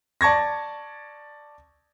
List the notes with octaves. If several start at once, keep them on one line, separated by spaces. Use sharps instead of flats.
D5 A5 C#6 G#6 A#6